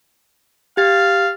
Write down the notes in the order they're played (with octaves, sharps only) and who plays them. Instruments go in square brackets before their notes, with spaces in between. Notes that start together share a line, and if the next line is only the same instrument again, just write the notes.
[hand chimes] G4 A6 [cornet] F5